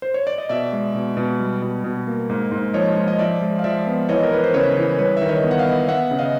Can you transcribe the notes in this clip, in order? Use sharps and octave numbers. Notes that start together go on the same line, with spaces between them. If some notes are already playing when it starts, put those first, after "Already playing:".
C5
C#5
D5
D#5
B2 D5 E5
G#3
B2
B2
G3
B2
B2
A#3
G#2
G#2
F3 C#5 D#5
G#2
D#5
F3 D5 E5
G#3
F5
F3 D5 E5
B3
E3 C#5 D#5
A#4
E3 B4
C5
C#3 B4 C#5
E3
G3 B4 C#5
D#3 E5
C#5 D#5
B3
F#5
D#5 F5
B3
B3 E5 F#5
C#3
D#5 F5